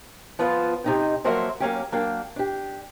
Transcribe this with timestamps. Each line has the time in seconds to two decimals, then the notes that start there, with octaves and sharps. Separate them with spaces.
0.39 F3 B3 F4 B4 C5
0.84 C3 D#4 G5
1.24 F3 F#3 A#3 F#4 C5 E5
1.60 F#3 A#3 C#4 G4
1.92 F#3 A#3 D4 G5
2.36 D4 G4